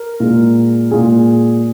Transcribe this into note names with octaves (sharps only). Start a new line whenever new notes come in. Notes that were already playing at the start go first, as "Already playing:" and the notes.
Already playing: A#4
A#2 G#3
A#2 G#3 G#4